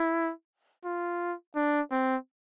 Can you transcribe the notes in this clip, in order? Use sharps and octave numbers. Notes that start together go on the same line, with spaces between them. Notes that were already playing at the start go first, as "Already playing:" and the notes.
Already playing: E4
F4
D4
C4